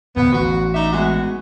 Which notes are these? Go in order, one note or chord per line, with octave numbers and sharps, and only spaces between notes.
D1 E2 B3
A1 F#4
D#4 D5 E5
G#3 B3 F#4